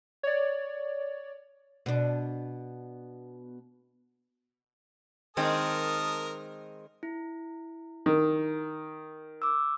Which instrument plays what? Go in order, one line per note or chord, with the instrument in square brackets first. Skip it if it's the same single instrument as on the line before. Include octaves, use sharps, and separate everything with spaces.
[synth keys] C#5 D5
[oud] B2 D4
[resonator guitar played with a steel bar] D#3 G#3 C4 [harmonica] A#4 A5 D#6
[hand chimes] E4
[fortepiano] D#3
[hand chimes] D6 E6